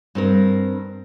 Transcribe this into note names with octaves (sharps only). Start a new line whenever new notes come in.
G2 C4 A#4